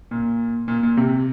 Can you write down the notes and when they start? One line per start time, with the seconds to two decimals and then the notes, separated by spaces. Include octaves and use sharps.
0.11 A#2
0.68 A#2
0.83 A#2
0.97 C3